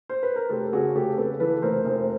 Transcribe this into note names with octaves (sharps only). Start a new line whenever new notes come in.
C5
B4
A#4
F1 G4 A4
C#3 F#4 G#4
F1 G4 A4
C#3 A4 B4
E3 A4 B4
F1 A#4 C5
F1